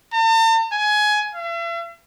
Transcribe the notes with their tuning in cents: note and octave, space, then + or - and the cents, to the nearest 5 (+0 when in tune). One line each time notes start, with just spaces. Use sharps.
A5 +45
G#5 +20
E5 +45